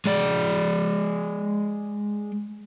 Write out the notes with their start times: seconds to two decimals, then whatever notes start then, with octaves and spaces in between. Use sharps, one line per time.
0.06 G#3 D5